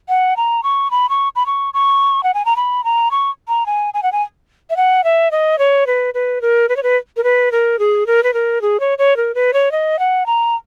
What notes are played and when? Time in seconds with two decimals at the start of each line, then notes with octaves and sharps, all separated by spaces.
0.09 F#5
0.37 A#5
0.63 C#6
0.91 B5
1.09 C#6
1.36 B5
1.46 C#6
1.74 C#6
2.23 F#5
2.34 G#5
2.45 A#5
2.56 B5
2.84 A#5
3.11 C#6
3.48 A#5
3.66 G#5
3.94 G#5
4.03 F#5
4.12 G#5
4.70 E5
4.77 F#5
5.04 E5
5.31 D#5
5.59 C#5
5.87 B4
6.14 B4
6.41 A#4
6.69 B4
6.77 C#5
6.83 B4
7.17 A#4
7.24 B4
7.52 A#4
7.79 G#4
8.07 A#4
8.23 B4
8.34 A#4
8.62 G#4
8.80 C#5
8.98 C#5
9.17 A#4
9.35 B4
9.53 C#5
9.72 D#5
9.99 F#5
10.26 A#5